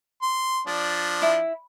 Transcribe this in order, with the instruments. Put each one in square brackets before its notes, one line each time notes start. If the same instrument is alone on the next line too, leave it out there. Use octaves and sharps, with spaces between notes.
[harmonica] C6
[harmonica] F3 D4 [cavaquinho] D5
[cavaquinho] E4